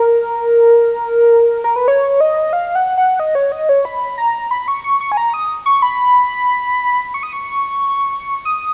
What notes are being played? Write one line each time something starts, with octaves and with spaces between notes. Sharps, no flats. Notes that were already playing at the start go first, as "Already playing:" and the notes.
Already playing: A#4
A#4
B4
C#5
D#5
F5
F#5
F#5
D#5
C#5
D#5
C#5
B5
A#5
B5
C#6
C#6
C#6
G#5
A#5
D#6
C#6
B5
C#6
D#6
C#6
D#6